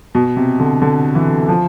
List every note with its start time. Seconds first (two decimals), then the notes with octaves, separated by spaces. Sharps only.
0.15 B2
0.36 C3
0.60 D3
0.82 D3
1.15 E3
1.48 F3